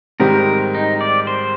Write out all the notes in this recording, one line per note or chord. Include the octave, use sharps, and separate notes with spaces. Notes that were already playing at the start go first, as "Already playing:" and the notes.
G#2 D#3 G3 C4 G4 A#4
D#4
D5
C5